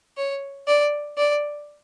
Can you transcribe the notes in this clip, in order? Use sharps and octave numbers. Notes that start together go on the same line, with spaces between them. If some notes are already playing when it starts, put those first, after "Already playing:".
C#5
D5
D5